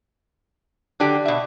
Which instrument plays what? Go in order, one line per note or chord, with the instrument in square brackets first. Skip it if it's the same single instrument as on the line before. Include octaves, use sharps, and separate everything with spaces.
[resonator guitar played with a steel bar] D3 F#3 G4 [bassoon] D4
[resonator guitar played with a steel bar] B2 E5